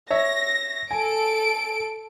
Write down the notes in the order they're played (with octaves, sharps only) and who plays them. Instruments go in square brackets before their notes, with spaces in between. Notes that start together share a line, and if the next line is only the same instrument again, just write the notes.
[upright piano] C#5 E5 [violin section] A#6
[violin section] A4 D7 [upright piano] G#5